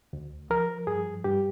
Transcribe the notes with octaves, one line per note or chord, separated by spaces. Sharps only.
D2
F3 A#4
G2 G#4
G2 G4